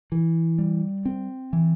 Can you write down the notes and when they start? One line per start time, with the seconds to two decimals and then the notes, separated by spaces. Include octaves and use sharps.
0.12 E3
0.58 G3
1.05 C4
1.53 E3